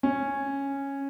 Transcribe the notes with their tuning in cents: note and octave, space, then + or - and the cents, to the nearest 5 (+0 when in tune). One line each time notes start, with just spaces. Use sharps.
C#4 -5